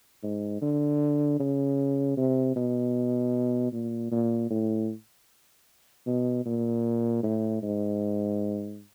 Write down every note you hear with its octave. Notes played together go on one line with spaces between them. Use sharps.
G#2
D3
C#3
C3
B2
A#2
A#2
A2
B2
A#2
A2
G#2